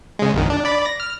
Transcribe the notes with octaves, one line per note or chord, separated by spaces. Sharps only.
C#3 G#3
A#1 F#2 D#3
D4
D5 B5
A#6
F6